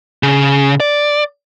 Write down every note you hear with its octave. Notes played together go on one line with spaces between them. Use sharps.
C#3
D5